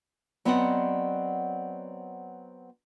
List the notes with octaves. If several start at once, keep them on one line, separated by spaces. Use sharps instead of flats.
F#3 B3 C4 D5 D#5 F#5